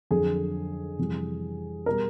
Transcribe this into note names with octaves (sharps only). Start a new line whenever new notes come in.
F2 D3 F#3 G#4
F2 C3 E3 G3
B2 G3 A#4